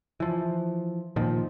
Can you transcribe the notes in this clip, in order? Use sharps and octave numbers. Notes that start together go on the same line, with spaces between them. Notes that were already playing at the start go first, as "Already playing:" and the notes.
E3 F3
A#2 D#3 F3